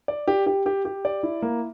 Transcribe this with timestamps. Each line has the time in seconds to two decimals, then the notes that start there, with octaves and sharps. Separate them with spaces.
0.08 D5
0.27 G4
0.47 G4
0.66 G4
0.85 G4
1.05 D5
1.23 E4
1.42 A#3